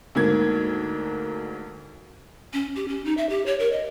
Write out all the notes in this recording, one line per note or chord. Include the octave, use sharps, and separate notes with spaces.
D2 G#2 A#3 G#6
C#4
G4
C#4
D#4
E5
G4
C#5
A#4
D#5